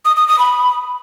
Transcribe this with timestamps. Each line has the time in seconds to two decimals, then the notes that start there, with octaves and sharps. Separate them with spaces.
0.05 D#6
0.17 D#6
0.28 D#6
0.39 B5